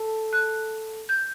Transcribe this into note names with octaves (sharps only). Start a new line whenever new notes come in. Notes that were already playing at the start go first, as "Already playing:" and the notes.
Already playing: A4
F#6
G6